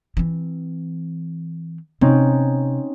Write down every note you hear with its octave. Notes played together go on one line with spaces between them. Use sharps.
E3 C4
C3 C4 C#4 D#4